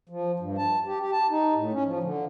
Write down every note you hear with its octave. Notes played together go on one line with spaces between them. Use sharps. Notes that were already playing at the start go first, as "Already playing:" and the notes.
F3
G2
A5
G4
G4
A5
D#4
A2
C#4
F3
D3